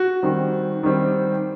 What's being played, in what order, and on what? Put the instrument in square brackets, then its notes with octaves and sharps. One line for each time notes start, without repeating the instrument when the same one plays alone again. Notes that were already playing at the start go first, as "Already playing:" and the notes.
Already playing: [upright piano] F#4
[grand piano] D#3 G3 C4
D#3 G3 C4